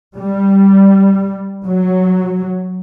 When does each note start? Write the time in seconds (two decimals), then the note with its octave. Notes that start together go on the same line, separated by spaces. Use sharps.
0.15 G3
1.66 F#3